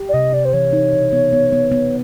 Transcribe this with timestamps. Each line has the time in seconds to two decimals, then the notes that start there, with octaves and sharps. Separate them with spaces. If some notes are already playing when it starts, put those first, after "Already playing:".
Already playing: G4
0.09 D5
0.14 C3 D#5
0.33 C3 D5
0.45 C5
0.53 E3 C#5
0.73 D#4
0.93 B2
1.12 B3
1.33 B3
1.52 B3
1.72 B3